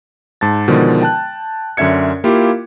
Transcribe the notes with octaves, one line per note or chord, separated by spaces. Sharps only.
G#2 A5 A6
B2 D3 D#3 F3 G#3
G5 A5 F#6
F#2 D3 C#4 E5 G#6 C#7
A#3 E4 F4 G4